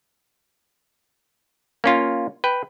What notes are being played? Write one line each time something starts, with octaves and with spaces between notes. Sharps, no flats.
A#3 C#4 F4
B4 G5